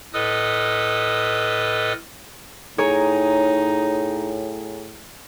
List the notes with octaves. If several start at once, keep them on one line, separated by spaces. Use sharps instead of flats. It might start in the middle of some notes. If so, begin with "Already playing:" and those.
A2 A4 B4 D#5 D#6 F6
A2 D#4 G#4 C#5 G#5 A#5